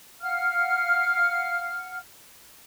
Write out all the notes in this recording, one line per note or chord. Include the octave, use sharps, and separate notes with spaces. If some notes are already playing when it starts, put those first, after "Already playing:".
F5 F#5 F6